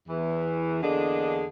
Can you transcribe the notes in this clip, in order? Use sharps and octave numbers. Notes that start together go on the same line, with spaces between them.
E2 E3
E2 D3 A#3 D4 G#4 D#5